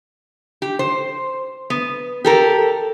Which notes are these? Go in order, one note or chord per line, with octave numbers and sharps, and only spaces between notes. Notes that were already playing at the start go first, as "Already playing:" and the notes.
G4
C5
B3
G4 A4 A#4